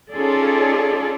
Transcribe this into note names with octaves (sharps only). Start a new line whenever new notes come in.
C#4 D#4 F4 G#4 A4 D5